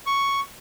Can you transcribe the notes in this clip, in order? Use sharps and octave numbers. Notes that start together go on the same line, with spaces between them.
C#6